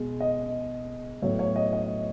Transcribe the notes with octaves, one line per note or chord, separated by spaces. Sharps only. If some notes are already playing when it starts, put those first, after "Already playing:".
Already playing: B2 G#3
D#5
A2 F#3 B3 C#5
C#5
D#5
D#5